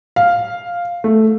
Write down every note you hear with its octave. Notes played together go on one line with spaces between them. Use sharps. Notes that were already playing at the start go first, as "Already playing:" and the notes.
F5
A3